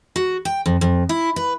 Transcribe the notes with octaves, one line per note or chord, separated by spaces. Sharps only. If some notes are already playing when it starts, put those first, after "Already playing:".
F#4
G5
F2
F2
E4
B4